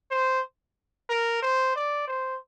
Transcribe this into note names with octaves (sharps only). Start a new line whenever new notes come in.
C5
A#4
C5
D5
C5